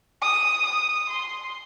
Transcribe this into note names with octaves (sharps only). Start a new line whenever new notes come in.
D#6
D#6
C6